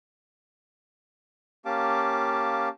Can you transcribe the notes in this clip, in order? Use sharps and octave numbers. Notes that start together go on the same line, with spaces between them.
A#3 C#4 G4 F5 A5 D6